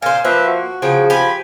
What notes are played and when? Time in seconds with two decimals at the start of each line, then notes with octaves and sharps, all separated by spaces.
0.02 A#2 C5 F5 G#5
0.25 F3 A#3 B4 C5 E5
0.47 F#4
0.82 C#3 F3 G#4 G5
1.10 G4 B4 G#5 B5